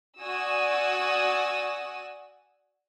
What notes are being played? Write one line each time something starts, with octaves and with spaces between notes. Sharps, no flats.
F#4 D5 G#5 C#6 D#6 E6